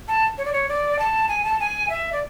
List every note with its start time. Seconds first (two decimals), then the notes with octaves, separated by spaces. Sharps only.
0.08 A5
0.38 C#5
0.45 D5
0.53 C#5
0.69 D5
0.99 A5
1.29 G#5
1.44 A5
1.60 G#5
1.90 E5
2.13 D5